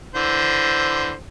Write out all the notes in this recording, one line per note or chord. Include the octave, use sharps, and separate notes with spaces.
D3 E3 C5